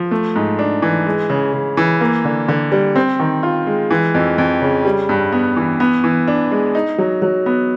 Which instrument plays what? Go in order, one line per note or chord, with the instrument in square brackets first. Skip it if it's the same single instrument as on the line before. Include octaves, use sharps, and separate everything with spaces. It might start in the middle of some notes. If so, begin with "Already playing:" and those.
Already playing: [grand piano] F3
A3
G#2
D4
E3
G#3
C#3
C#3
E3
A#3
D3
D3
G3
C4
D#3
F4
G#3
E3
F2
F2
C#3
G3
G2
B3
E3
B3
E3
D4
G#3
D#4
F#3
F#3
B3